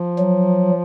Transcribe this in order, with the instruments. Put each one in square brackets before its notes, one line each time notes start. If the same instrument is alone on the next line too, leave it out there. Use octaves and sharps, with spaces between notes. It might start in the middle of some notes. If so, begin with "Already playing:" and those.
Already playing: [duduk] F3
[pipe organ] F#3